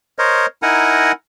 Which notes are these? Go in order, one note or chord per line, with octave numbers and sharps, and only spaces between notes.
A#4 C5 C#5 D#5
D#4 E4 A#4 F#5 G#5 A#5